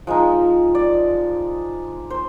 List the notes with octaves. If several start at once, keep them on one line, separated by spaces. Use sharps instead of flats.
F3 G#3 D#4
D5
C5